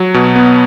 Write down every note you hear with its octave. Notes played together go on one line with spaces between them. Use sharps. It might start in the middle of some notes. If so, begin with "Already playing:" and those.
Already playing: F#3
B2
B3